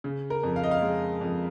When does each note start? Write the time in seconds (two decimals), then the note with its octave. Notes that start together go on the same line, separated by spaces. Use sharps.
0.04 C#3
0.30 A#4
0.43 F2
0.56 F5
0.64 D#5
0.71 F5
0.82 G#3
1.21 F2